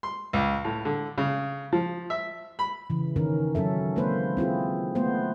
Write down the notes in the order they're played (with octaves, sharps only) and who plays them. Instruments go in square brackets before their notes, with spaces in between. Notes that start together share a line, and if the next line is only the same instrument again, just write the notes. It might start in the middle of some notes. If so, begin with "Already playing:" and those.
[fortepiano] C6
C#2
A2
D3
C#3
F3
E5
B5
[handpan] C#3 E3
D#3 C#4 A#4
F#3 C#4 A4 E5
G#3 A#3 C4 B4 C5
C4 E4 F4 G#4
A3 B3 C5